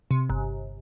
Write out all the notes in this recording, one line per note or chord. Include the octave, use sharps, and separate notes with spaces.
C3
G1